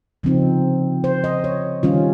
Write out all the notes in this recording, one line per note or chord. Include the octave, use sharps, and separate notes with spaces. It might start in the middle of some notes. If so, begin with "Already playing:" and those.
C#3 F3 C4 D#4
C5
D#5
C#5
D#3 G3 C#4 F4